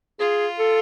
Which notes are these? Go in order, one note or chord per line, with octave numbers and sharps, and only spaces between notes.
F4 G#4
A4